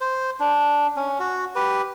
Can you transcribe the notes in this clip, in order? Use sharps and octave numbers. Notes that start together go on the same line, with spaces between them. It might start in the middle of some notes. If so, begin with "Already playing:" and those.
C5
D4
C#4
F#4
G4 B4